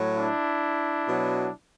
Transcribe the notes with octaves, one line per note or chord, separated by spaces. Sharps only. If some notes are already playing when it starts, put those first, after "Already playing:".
Already playing: A2 F#3
D4 E4
B2 F#3